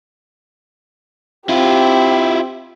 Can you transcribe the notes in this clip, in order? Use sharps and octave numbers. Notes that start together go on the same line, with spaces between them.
C4 E4 F4 G4